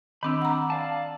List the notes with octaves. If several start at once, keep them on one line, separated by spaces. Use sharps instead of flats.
D#3 C4 D4 B5 D6 E6
F#5 A#5
D5 F5 A5